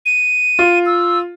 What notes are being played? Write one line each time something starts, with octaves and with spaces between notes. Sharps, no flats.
D#7
F4
E6